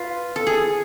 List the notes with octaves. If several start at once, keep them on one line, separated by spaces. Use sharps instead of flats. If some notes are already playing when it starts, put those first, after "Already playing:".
Already playing: F4 B4
A4
G#4